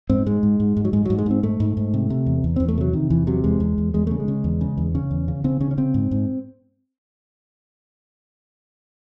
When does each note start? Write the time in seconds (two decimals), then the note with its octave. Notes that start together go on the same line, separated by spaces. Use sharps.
0.10 G#2 C4
0.26 G#2 G#3
0.43 G#2
0.60 G#2
0.77 G#2
0.85 F#3
0.93 G#2 G#3
1.05 G#2 F#3
1.18 G#3
1.26 G#2 C4
1.43 G#2 A3
1.60 G#2
1.77 G#2
1.94 C3
2.10 C3
2.26 E2
2.44 E2
2.56 E2 C4
2.68 A3
2.78 C3 F#3
2.93 C3 D#3
3.10 E2 E3
3.27 C3 F#3
3.44 E2 G#3
3.60 E2
3.78 E2
3.94 E2 G#3
4.07 C#3 A3
4.20 G#3
4.28 C#3
4.44 E2
4.61 C#3
4.77 E2
4.95 C#3 C#4
5.11 E2
5.28 C#3
5.44 C#3 C4
5.60 C#3 C#4
5.71 C#4
5.77 C#3 C4
5.94 G#2
6.11 G#2